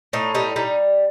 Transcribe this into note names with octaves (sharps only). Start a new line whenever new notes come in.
A2 D#4
G3 D#4
G3 D#4